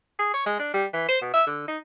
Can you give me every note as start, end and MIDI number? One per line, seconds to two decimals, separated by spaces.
0.19 0.29 68
0.34 0.44 73
0.46 0.57 56
0.59 0.70 62
0.74 0.86 55
0.94 1.06 52
1.08 1.18 72
1.21 1.32 47
1.34 1.43 76
1.47 1.66 50
1.68 1.78 63